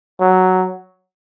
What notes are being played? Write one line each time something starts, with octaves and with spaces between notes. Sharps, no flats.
F#3